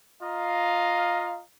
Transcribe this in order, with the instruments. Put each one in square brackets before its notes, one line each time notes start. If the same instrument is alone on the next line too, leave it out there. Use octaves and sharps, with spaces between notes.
[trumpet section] F4 D#5 F5 A#5